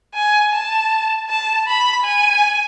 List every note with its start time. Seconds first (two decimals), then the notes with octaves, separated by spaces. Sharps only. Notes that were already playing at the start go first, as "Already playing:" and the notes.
0.15 G#5
0.53 A5
1.30 A5
1.67 B5
2.05 G#5